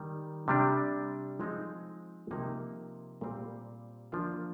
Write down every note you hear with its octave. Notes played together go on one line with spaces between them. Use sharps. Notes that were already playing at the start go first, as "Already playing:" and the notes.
Already playing: D#3 G3
C3 G3 D4
F3 G#3 C4 D#4
C3 F3 A#3 D#4
A#2 G3 C4
F3 A#3 D4 F4